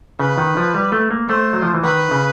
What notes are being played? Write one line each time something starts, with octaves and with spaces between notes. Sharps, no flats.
C#3 B4
D#3
F3
G3
A3
A#3
A3 C5
F#3
F3
E3
D#3 B4
C#3